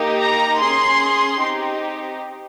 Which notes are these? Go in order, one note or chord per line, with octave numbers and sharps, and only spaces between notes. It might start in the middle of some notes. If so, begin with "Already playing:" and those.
Already playing: A#3 D#4 G4
A#5
C#4 G#4 C6
C4 D#4 G4